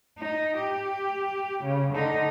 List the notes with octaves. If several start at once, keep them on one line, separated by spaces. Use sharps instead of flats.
D#4
G4
C#3
D3 D#4